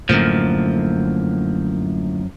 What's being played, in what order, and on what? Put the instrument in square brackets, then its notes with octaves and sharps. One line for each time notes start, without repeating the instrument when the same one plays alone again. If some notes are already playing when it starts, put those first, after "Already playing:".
[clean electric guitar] F#2 F3 [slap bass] A2 D3 A#3